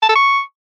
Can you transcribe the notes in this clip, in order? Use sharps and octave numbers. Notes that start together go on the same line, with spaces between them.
A5
A4
C#6